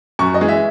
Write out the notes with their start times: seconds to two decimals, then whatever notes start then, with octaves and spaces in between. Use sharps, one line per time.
0.19 F#2 C#6
0.34 D#5
0.41 E3 G#3
0.49 E5